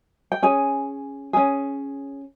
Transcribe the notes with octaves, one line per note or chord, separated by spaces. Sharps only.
G5
C#4 G#4 G#5
C#4 G#4